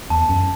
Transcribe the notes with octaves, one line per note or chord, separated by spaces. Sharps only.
E2 A5
F#2